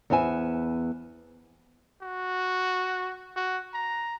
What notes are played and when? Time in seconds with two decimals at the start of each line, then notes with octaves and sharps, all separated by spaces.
0.10 E2 B3 C5 E5 G#5
2.03 F#4
3.36 F#4
3.74 A#5